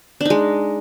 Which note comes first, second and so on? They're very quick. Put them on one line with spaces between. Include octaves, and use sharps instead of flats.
D4 D#4 G#3